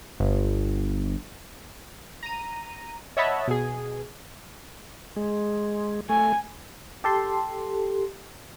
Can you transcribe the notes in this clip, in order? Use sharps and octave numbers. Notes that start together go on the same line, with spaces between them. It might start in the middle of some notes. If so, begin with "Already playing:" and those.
G1
A#5 D#7
C#5 D#5 E5 F#5 A5 B5
B2 G#4
G#3
A3 G#5
G4 A4 C6